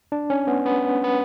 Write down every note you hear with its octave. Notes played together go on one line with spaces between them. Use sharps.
D4
C#4
B3
B3
B3